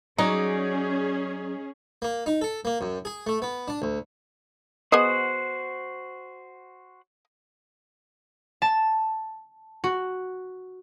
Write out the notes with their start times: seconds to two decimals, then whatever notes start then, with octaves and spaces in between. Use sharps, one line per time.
0.18 F#3 C#4 D#4 G#4 D5
2.02 A#3
2.26 D#4
2.41 A4
2.65 A#3
2.81 F#2
3.05 G#4
3.27 A3
3.42 B3
3.68 D4
3.82 D2
4.92 B3 F#4 G#4 C5 D#5 F#5
8.62 A5
9.84 F#4